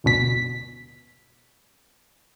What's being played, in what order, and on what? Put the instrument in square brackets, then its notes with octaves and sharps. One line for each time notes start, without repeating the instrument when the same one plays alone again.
[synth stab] G1 D2 B2 B6